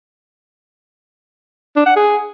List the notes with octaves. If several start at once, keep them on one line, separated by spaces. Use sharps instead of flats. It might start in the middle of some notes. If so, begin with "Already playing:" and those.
D4
F#5
G#4